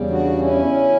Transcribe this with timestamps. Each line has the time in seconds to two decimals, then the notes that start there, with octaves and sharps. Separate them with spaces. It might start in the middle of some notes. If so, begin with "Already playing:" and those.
Already playing: E2 C#3 G3
0.10 D4 F#4
0.38 C#4 E4